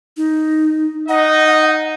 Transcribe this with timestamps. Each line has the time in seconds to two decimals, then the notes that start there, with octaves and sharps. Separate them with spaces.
0.17 D#4
1.09 D#4 D#5 F#5